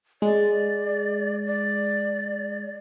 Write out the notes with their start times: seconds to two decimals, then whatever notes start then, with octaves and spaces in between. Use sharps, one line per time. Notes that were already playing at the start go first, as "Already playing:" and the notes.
0.22 G#3 D5
1.46 D5